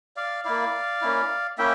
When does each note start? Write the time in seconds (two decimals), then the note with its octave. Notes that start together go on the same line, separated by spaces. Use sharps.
0.17 D5 F5
0.45 A#3 E4 D5 F5
1.02 A#3 C#4 E4
1.58 A#3 C#4 E4 E5 G5